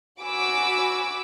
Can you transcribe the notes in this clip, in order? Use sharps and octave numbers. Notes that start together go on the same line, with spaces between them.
F#4 G#5 B5 D6 E6